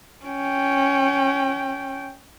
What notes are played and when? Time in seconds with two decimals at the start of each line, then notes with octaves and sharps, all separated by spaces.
0.25 C#4 G5